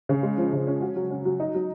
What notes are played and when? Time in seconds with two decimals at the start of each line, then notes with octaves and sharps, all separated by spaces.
0.09 C#3
0.23 G#3
0.38 F3
0.53 C#3
0.67 C#4
0.81 F#4
0.96 F#3
1.11 C#4
1.25 F#3
1.40 D#4
1.54 F#3